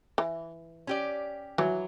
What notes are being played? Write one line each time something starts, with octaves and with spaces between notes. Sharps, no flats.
E3
C#4 G4 D5
E3 F#3